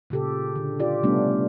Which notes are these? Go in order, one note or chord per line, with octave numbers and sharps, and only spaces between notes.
A#2 C#3 G4 A4
D3
F4 G4 D5
C3 G3 A3 B3 C#4 D4